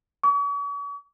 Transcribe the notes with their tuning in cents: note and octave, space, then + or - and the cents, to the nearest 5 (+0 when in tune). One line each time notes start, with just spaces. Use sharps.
C#6 +45